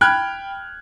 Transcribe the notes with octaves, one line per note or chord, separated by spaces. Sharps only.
G5 B5 F6 F#6 G#6